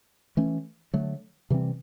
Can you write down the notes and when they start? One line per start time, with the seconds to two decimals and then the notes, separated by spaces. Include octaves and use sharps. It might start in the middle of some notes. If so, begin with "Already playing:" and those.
0.37 E3 A3 C#4
0.94 D3 F#3 A3
1.50 C3 E3 G3 C4